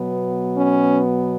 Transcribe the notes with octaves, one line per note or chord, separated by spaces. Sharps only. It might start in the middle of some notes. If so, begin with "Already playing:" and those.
Already playing: B2 F#3 B3
C#4